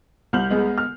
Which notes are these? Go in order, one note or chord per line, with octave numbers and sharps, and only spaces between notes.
C2 F6 G6 F#7
G#3 B3 G#4
F6